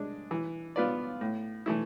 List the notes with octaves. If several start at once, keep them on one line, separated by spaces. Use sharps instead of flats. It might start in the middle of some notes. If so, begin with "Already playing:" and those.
Already playing: G#3 D4
E3
B3 F4 B4 D5
A2
E3 A3 E4